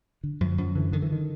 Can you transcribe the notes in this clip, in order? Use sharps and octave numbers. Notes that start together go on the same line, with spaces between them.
D3
F#2 F3
F#2 F3
D3 E3
D3 D#3
E3
D#3